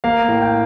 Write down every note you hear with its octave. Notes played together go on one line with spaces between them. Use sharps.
A#3 F5
A2
G5